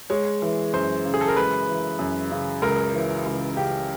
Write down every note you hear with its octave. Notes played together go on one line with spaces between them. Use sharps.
G#3 C#5
E3
F#2 C5
C#3
G#4
A4
A#4
G#3 B4
E3
F#2
C#3
C#2 A#4
E3
C#2
C#3 G4